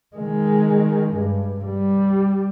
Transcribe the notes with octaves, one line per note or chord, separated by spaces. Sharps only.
D#3 G#3
G2
G3